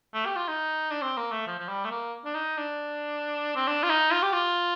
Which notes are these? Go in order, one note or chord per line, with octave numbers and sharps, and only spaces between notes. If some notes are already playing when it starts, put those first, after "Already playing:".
A3
G4
F4
D#4
D4
C4
A#3
A3
F3
F3
G3
A3
A#3
D4
D#4
D4
C4
D4
F4
D#4
F4
G4
F4